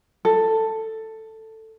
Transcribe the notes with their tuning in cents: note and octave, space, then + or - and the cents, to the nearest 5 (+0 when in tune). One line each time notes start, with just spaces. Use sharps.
A4 +10